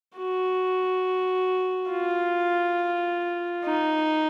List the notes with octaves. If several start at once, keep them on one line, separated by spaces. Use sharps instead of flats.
F#4
F4
D#4